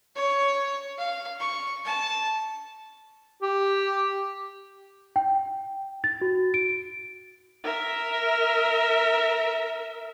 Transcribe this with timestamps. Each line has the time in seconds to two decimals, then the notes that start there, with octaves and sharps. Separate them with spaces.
0.16 C#5
0.98 F5
1.40 C#6
1.85 A5
3.42 G4
5.16 G5
6.04 A6
6.21 F#4
6.54 D7
7.64 A#4 E5